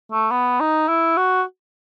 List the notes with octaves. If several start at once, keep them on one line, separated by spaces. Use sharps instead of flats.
A3
B3
D#4
E4
F#4